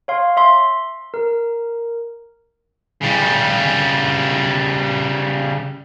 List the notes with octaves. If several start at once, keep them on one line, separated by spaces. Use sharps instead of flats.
C#5 F5 C6
E5 C6
A#4
C#3 G3